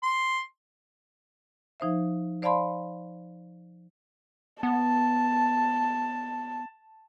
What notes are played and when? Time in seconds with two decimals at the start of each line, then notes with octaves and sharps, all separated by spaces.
0.03 C6
1.80 F3 D#4 C5 E5
2.42 C5 D5 F5 A5 B5 C6
4.63 B3 A5